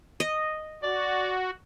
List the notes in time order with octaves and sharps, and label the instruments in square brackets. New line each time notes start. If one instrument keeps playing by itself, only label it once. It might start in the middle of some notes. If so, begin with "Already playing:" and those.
[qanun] D#5
[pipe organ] F#4 [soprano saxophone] D5